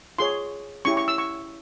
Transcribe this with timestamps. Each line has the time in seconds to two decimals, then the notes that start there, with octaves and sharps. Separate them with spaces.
0.19 F4 G#4 C#5 C6
0.85 C#4 E4 G4 C#6
0.97 C#6
1.08 E6
1.18 C#6